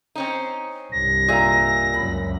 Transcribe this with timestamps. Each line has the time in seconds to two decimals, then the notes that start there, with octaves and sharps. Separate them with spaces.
0.16 C4 C#4 D#4
0.92 C2 G2 A#6
1.28 A#2 G#4 E5 A#5
1.94 C#2 F#2 B5